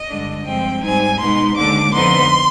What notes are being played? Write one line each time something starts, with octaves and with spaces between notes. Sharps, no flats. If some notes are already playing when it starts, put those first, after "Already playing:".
Already playing: D#5
G2 D3 G#3 D4
G2 F3 G#3 C4 G5
G#2 G3 C4 D#4 G#5
B2 G#3 B3 D#4 C6
D#2 D3 G#3 D4 D6
F2 D3 F3 B3 D#4 C6